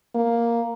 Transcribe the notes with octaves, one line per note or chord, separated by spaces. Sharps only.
A#3